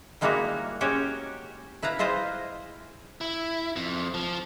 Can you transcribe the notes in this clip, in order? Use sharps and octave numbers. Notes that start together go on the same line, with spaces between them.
G3 G#3 A#3 D#4 E4 F#4
G#3 C#4 F#4 G4 C#5
E4 B4 F5 A#5
G#3 E4 F4 C5 D#5 F5
E4
F2
F3